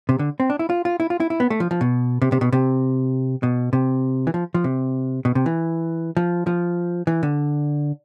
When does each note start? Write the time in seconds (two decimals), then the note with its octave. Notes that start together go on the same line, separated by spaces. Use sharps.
0.09 C3
0.19 D3
0.40 C4
0.50 D4
0.59 E4
0.70 F4
0.85 F4
1.00 E4
1.10 F4
1.20 E4
1.30 E4
1.40 B3
1.50 A3
1.60 F3
1.71 F3
1.81 B2
2.22 C3
2.32 C3
2.41 B2
2.52 C3
3.43 B2
3.73 C3
4.27 E3
4.34 F3
4.54 F3
4.64 C3
5.25 B2
5.35 C3
5.46 E3
6.17 F3
6.47 F3
7.07 E3
7.23 D3